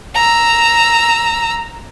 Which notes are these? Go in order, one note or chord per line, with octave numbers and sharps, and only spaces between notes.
A#5 E6